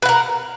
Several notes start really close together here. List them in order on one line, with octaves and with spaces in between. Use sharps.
B4 F#5 A#4